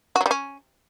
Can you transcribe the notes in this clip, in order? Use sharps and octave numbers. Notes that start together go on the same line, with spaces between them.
F#4
F#3
G3
C#4